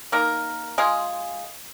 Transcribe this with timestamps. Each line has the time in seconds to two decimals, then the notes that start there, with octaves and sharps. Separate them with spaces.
0.12 A#3 D#4 A#4
0.78 G#3 F4 G#4